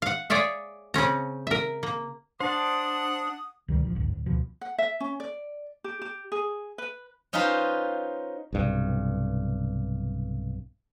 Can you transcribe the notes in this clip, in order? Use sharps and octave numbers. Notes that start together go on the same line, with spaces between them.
F5 F#5
G#4 C#5 D5 E5 F5
C#3 C4 C#4 A#5
A#4 E5
A#3
D4 C5 F#5 A5 D#6
C#2 B2 D#3 G3
D#1 A#1 F3
D1 G#1 D2 G2
D1
D2 B2 F3
F#5
E5
C#4
D5
G4
G4
G#4
B4
C#4 D#4 F4 B4 C5
B1 G2 C3